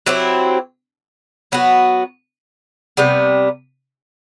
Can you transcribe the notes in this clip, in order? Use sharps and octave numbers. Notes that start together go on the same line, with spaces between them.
F#3 C4 E4 G4
F#3 B3 F#4
C3 G3 B3